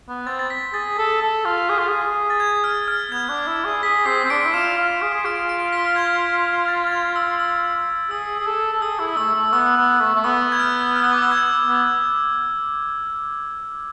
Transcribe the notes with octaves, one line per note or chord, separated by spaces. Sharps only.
B3
C4 A6
A6
B6
G#4 A6
A4
A4
F4
G#4
F4
G#4
A6
G#6
F6
F6
B3 G#6
D4
E4
G#4
G#4 B6
C4 C7
C4
D4 D7
E4
F4 E7
F4
G#4
G#4
F4 D7
D7
B6
G#6
A6
A6
G#6
E6
E6
G#4 E6
G#4
A4
A4
G#4 E6
E4
A3 E6
A3
B3 E6
B3
A3
A3
B3 E6
G#6
F6
F6
E6
D6
E6
G#6
B3